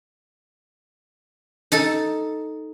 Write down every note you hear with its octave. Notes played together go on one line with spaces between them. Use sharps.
D#4 A4 A5